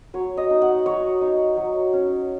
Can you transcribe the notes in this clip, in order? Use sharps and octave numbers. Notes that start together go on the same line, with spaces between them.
F#3 C#5
D#5
D#4
F#5
F#3 C#5
D#4
F#3
C#4